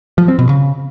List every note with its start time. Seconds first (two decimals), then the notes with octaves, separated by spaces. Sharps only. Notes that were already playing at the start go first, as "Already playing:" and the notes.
0.18 F3
0.28 C4
0.39 B2
0.49 C#3